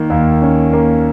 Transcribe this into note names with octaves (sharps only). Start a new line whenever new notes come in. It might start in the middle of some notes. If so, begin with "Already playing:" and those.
Already playing: D#3 A#3
D#2
C#4
A#3